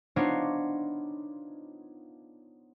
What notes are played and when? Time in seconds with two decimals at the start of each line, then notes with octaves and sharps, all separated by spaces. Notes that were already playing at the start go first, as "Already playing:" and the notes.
0.16 B3 D4 D#4 F4 C5 C#5